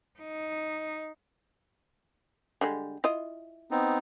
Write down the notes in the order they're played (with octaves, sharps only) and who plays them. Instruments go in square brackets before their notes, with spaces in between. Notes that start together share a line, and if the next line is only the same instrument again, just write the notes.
[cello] D#4
[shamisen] D3 G3 G#3
E4 F4 D#5
[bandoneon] B3 C4 D#4